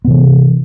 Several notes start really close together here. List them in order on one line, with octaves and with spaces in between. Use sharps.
B3 C3 E3